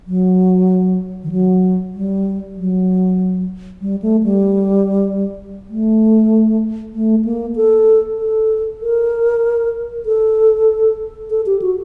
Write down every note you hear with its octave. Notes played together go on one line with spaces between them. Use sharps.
F#3
D#3
F#3
G3
F#3
G3
A3
G3
A3
A3
A#3
A4
A4
A#4
A4
A4
G4
F#4